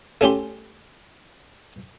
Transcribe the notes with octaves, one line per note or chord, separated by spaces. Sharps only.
A3 C#4 G4 C6